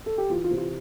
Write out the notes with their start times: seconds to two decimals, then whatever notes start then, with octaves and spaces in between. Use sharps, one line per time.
0.06 A4
0.18 G4
0.30 E3 F4
0.44 F4
0.51 C3
0.58 F4